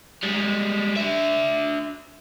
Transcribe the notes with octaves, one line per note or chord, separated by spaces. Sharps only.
G3 G#3
D4 E5